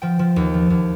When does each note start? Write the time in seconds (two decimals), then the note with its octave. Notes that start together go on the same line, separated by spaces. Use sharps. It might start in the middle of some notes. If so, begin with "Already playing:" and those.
0.02 F3 G5
0.19 F3
0.36 D#2
0.54 F3
0.70 D#2